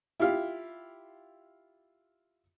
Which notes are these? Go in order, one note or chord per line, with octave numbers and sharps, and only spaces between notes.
E4 F4 G4 F5